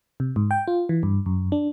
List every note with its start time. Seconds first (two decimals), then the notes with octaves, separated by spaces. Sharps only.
0.20 C3
0.36 G#2
0.51 G5
0.68 F4
0.89 E3
1.03 G2
1.26 F#2
1.52 D4